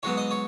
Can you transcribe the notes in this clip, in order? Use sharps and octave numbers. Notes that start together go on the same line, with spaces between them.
G#2 F#3 B3 C#5
D#5
C#5